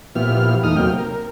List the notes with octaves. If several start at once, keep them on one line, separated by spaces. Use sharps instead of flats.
A#2 F3 B3 E4 G4 F6
E2 A3 D#4 D#6 F6
C3 F#3 A#3 G5 F6
A#4